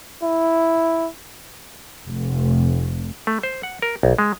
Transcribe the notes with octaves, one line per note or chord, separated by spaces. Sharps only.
E4
F1
A3
C5
F#5
A#4
B1
G#3